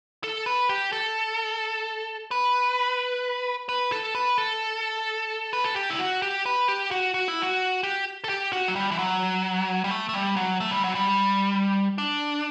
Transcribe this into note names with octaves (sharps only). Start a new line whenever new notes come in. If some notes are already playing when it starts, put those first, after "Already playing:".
A4
B4
G4
A4
B4
B4
A4
B4
A4
B4
A4
G4
E4
F#4
G4
B4
G4
F#4
F#4
E4
F#4
G4
A4
G4
F#4
F#3
G3
E3
F#3
G3
A3
A3
G3
F#3
A3
G3
F#3
G3
D4